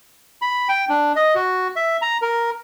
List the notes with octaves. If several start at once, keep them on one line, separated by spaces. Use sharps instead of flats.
B5
G5
D4
D#5
F#4
E5
A#5
A#4